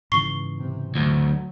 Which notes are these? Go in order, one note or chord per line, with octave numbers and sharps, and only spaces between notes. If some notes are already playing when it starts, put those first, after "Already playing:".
G#2 C#3 E3 C#6 C7 G7
C3
D2 F#3